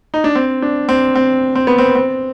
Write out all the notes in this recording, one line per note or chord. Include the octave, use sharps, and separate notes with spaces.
D#4
D4
C4
D4
C4
C4
C4
B3
C4
C4